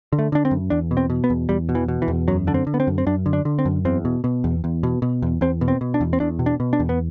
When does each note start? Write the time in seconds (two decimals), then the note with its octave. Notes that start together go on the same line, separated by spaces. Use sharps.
0.13 D3
0.19 A3
0.32 D3 D4
0.45 C4
0.51 F#2
0.70 E2 D4
0.91 B2
0.97 C4
1.10 B2
1.24 B3
1.30 E2
1.49 E2 G3
1.69 B2
1.75 E3
1.88 B2
2.02 E3
2.08 E2
2.28 F#2 F#3
2.47 D3 D4
2.54 C4
2.67 D3
2.74 B3
2.80 C4
2.87 F#2
2.98 C4
3.06 F#2 D4
3.26 D3
3.33 D4
3.45 D3
3.59 C4
3.65 F#2
3.85 E2 C4
4.05 B2
4.24 B2
4.44 E2
4.64 E2
4.83 B2
5.02 B2
5.22 E2
5.41 E2 C4
5.61 B2
5.68 C4
5.81 B2
5.94 D4
6.01 E2
6.13 C4
6.20 E2 D4
6.39 B2
6.46 D4
6.60 B2
6.73 D4
6.80 E2
6.89 B3